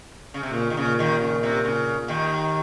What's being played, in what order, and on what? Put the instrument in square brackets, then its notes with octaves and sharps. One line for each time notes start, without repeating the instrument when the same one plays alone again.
[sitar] C#3
C3
[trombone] A#2 [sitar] C#3
[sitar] D#3
[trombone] A#2 [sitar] C#3
[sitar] D#2 D#3
C#3
C3
C#3
D#2 D#3